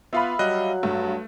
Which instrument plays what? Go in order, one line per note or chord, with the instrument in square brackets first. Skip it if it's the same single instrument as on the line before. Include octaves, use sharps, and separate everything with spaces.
[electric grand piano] B3 F4 B4 [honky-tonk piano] E5 F5 B5
[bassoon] F#3 [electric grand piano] G3 D#5 F#6
[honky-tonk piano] G2 [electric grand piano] A3